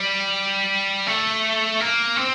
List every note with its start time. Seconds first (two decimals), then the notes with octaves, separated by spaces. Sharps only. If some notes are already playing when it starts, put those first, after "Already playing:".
Already playing: G3
1.07 A3
1.80 A#3
2.17 C4